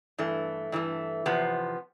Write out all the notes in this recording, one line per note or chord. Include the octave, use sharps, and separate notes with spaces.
G2 E3 A3
G2 E3 A3
E2 C3 F3 B3